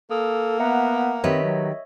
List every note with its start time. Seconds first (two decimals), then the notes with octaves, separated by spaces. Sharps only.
0.11 A#3 A4 D#6
0.60 B3 E5 F#5 A#5
1.24 D#3 C4 G4 B4 C#5 D#5 E5
1.43 F#3